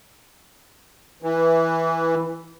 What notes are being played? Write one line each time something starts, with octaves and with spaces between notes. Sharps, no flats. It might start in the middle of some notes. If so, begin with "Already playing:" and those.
E3